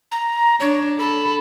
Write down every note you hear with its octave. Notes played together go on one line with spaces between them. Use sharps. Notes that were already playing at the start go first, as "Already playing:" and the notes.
A#5
D4 C#5
A4 B5